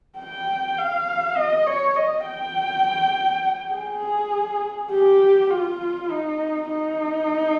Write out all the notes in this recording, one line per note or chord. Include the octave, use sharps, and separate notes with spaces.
G5
F5
D#5
C#5
D#5
G5
G#4
G4
F4
D#4
D#4